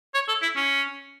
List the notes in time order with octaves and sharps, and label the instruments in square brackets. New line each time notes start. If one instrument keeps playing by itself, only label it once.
[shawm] C#5
A4
E4
C#4